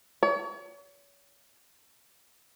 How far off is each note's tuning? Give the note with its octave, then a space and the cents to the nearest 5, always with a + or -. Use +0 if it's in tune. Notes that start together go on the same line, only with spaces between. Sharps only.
C#5 +40